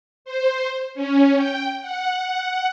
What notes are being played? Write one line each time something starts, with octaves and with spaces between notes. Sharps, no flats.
C5
C#4
G5
F#5